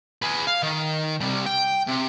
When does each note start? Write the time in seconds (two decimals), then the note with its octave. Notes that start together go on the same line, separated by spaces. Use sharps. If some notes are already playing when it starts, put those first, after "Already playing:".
0.22 G#4 B4
0.47 F5
0.63 D#3
1.21 C3 G3
1.46 G5
1.87 C3